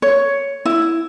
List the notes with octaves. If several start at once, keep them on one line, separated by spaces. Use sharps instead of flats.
C#5
E4